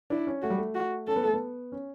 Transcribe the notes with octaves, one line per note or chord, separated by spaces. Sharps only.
D4 E4
C#4
A3 F#4
G3
A3
F#4
C#4 A4
B3
A3
B3
C#4